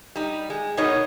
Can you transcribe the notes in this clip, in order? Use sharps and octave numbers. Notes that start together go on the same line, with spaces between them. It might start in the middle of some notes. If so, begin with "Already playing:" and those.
G3 D#4
G#3
B2 D#4 A#4 C#5 D#5